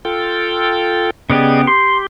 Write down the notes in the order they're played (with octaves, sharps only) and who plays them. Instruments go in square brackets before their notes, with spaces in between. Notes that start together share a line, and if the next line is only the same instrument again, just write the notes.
[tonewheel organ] F4 A4 G5
[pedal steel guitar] C#3 B3 G4 [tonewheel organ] G#4 D5 D#5
[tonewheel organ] G4 [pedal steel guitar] C6